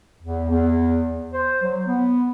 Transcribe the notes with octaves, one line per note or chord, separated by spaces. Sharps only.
E2
E2
C5
F#3
B3